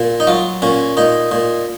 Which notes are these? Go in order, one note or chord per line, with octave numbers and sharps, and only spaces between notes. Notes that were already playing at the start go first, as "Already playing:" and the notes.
Already playing: A#2
D#4
F#3 F4
A#2 C#4
A#2 D#4
A#2